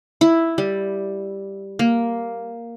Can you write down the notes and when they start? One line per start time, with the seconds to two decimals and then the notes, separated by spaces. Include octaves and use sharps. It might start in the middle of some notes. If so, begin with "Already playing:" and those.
0.21 E4
0.58 G3
1.79 A#3